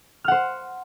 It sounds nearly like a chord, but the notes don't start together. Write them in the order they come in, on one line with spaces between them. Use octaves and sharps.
F6 F#5 C5